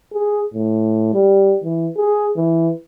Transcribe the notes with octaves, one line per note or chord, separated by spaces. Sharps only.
G#4
A2
G3
E3
G#4
E3